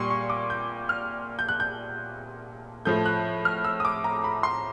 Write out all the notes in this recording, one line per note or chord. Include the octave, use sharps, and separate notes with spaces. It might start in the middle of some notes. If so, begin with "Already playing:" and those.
Already playing: A#2 G3 C6 C#6
C#6
D6
G6
F6
G6
F#6
G6
A2 F3 A3 G6
F#6
F6
E6
D#6
D6
A#5
B5
C6